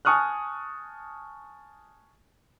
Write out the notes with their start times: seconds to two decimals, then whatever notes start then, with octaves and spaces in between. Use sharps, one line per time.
0.05 G#5 A5 C#6 D#6 F6 F#6